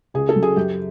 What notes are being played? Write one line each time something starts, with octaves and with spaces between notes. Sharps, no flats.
C#2 G#4
A4
C#3 F#3
G#4
F#2 G4